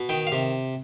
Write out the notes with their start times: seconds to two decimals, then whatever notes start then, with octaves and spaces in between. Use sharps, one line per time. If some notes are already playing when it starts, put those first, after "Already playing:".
Already playing: B2
0.09 D#3 G5
0.27 F5
0.32 C3